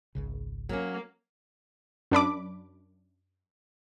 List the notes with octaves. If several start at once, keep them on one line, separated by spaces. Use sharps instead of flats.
G#1 C#2 C#3
F#3 A#3 C#4
F#2 D4 B5 D6